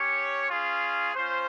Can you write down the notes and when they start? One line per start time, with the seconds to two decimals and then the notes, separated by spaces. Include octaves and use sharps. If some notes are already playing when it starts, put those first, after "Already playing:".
Already playing: C#4 G4 C#5
0.49 C#4 F4 G#4
1.14 C#4 F4 C5